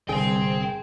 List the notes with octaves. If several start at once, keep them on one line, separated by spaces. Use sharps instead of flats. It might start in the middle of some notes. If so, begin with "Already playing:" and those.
G1 C2 G#4 G5 C6